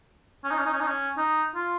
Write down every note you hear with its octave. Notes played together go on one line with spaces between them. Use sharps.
C#4
D#4
C#4
D#4
C#4
D#4
C#4
D#4
F4